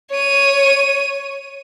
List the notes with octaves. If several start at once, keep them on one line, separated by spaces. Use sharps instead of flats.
C#5 D#7